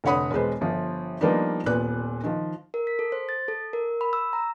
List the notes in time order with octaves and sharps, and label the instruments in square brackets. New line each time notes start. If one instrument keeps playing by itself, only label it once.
[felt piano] F1 D3 C#5 F#5 B5 D#6
E1 G#3 B4 C5
G1 F3
F3 G3 A#3 B3 D4 D#4
D#1 A#2 B3 D5 F#6
D#3 F3
[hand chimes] A#4
B6
A4
C5
A6
A4
A#4
B5
E6
A#5